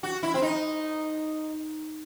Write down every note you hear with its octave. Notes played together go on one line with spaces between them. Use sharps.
F#4
E4
C4
D#4